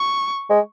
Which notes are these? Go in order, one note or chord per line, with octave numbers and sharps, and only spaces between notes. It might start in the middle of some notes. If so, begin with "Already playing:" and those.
Already playing: C#6
G#3